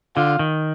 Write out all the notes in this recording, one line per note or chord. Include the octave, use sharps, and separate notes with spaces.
D3 F4
D#3